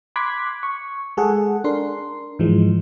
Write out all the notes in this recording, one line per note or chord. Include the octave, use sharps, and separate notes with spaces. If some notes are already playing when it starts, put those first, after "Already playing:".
B5 C6 D6 F#6 G#6 B6
C#6
G#3 G#4 A4 F#5
D4 A#4 C6
G#2 E3 F3 G#3